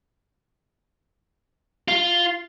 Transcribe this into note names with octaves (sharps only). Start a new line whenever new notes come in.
F4